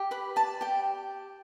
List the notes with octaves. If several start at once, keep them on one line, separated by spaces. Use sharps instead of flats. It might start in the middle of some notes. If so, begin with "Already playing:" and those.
Already playing: G4
B4 B5
D5 A5
G4 G5